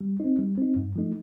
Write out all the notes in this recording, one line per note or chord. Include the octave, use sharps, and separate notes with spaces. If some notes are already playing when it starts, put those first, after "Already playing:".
G3
C4 D#4
G3
C4 D#4
G2
F3 A3 D#4